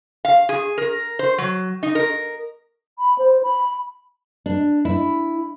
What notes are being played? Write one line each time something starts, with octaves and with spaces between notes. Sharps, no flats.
F5
G#4
A#4
C5
F#3
D#4
A#4
B5
C5
B5
D4
E4